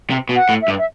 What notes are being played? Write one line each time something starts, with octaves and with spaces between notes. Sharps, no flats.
C3
B2
F#5
A2
E5
G2
E5